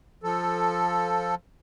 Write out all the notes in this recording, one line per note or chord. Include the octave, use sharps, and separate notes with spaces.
F3 A4